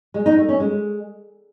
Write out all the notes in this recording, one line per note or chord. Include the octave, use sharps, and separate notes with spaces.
G#3
D#4
A3
C#4
G#3